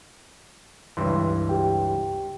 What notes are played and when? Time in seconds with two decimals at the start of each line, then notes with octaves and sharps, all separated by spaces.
0.97 C#2 G2 E3 C6
1.49 G4 G5